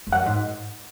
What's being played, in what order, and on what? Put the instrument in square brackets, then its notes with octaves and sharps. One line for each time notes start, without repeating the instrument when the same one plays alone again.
[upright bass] F2
[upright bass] F#2 [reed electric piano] F#5
[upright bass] G#2